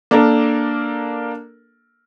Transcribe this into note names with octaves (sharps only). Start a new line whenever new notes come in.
A#3 D4 A4 A#4